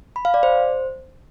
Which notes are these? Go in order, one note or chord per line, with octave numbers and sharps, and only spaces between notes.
B5
F5
D5
C5